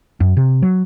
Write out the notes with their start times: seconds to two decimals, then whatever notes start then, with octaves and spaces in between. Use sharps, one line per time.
0.20 F#2
0.37 C3
0.62 F#3